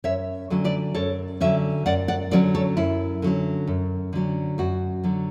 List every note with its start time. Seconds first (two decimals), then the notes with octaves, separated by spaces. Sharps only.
0.04 F#2 C#5 E5
0.50 D3 F#3 C#4
0.64 B4 D5
0.95 F#2 A4 C#5
1.40 D3 F#3 C#4 C#5 E5
1.86 F#2 D5 F#5
2.08 D5 F#5
2.31 D3 F#3 C#4 B4 D5
2.55 A4 C#5
2.77 F#2 E4
3.22 D3 F#3 C#4
3.67 F#2
4.13 D3 F#3 C#4
4.58 F#2 F#4
5.04 D3 F#3 C#4